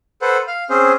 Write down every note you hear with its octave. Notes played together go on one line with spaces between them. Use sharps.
A4 B4 C5 F#5
F5
C4 C#4 G#4 C5